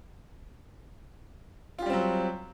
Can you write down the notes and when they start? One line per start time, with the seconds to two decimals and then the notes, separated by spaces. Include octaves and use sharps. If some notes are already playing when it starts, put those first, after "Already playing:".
1.78 F4
1.82 G4
1.86 G3
1.90 C4
1.93 F#3